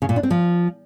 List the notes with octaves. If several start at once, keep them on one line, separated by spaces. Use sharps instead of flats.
C#3
A#2
D4
C4
F3